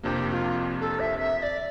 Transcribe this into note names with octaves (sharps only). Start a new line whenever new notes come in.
F2 C3 F3 A#3 D4 G4
G4
F4
A4
E5
E5
E5
D5